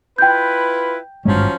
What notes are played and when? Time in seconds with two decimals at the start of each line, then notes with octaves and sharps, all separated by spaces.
0.18 E4 F4 B4 G5 G6
1.25 G#1 G2 F3 F#3 G#3 C#4